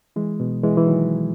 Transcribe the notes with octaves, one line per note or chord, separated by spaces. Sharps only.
E3 G#3
B2
E3 G#3
E3
D#3 F#3